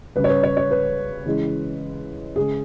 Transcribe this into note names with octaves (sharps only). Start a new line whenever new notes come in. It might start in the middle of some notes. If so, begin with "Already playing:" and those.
C#3 G3 B4
C#5
B4
C#5
C#5
B4
C#3 E3 G#3
C#3 G#3 G#4